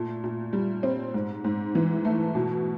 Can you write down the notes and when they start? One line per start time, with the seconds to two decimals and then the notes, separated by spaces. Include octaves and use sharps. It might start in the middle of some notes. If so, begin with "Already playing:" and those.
Already playing: A#2 A3
0.24 A#2
0.53 G3
0.83 C4
1.14 G#2
1.44 G#2
1.75 E3
2.05 A3
2.35 B2